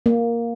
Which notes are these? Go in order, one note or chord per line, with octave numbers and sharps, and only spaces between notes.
A#3